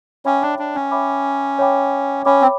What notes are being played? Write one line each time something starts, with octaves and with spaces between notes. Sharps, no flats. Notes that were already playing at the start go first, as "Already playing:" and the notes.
C#4 C#5 E5 G5 B5 D6
D4
D4
C#4
C#5 E5 G5 B5 D6
C#5 E5 G5 B5 D6
C#4 C#5 E5 G5 B5 D6
C4